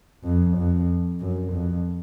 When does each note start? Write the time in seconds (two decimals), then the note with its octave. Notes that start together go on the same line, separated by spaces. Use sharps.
0.24 F2
0.56 F2
1.20 F#2
1.52 F2